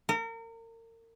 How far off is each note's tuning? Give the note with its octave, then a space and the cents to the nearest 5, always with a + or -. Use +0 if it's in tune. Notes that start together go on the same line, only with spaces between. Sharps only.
A#4 -35